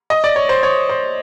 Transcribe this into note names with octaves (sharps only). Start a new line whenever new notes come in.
D#5
D5
C#5
C5
C#5
C5